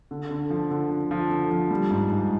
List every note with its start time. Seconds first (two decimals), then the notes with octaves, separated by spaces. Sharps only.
0.11 D3
0.31 D3
0.50 F3
0.71 D3
0.91 D3
1.11 F3
1.30 D3
1.51 F3
1.71 G3
1.91 G#2
2.10 G#2